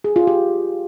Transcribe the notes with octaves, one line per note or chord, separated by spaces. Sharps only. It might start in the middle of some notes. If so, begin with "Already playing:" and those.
G#4
F4
G4